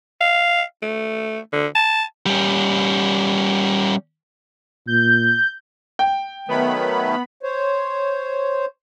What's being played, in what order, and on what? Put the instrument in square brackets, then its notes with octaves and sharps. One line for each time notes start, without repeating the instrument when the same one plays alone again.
[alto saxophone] F5
A3
D3
A5
[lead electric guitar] G3 C#4
[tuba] A#2 [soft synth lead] G6
[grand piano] G5
[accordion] D#3 F#3 A3 [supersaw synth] B3 B5
[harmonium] C5 C#5